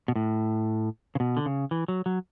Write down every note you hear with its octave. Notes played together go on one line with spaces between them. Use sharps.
B2
A2
C#3
B2
D3
C#3
E3
F#3
F#3